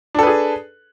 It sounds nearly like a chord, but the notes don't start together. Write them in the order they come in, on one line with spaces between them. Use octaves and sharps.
D4 A4 B4 G#4